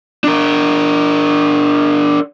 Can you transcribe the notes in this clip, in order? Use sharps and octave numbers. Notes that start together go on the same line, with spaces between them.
D4 A#4